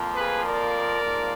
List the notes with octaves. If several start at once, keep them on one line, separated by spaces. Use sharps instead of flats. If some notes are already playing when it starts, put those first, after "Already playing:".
Already playing: F2 F3 A#3
G#4 B4
A#4 D5
G#2 F3 A#3